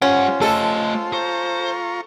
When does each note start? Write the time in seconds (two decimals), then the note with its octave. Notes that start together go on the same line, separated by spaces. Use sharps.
0.02 G3 C#4 F4 C5 F#5
0.41 A3 A4 D#5
1.13 F4 C5 A#5 C#6